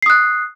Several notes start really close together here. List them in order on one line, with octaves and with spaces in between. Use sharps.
C7 D#6 F#6